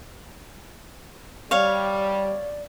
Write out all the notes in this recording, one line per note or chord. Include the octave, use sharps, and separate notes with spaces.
G3 C#5 D5 F5